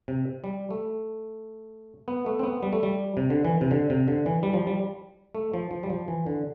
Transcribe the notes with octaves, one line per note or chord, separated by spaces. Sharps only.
C3
G3
A3
B3
A3
C4
B3
G3
A3
G3
C3
D3
E3
C3
D3
C3
D3
E3
G3
F3
G3
A3
F3
F3
G3
F3
E3
D3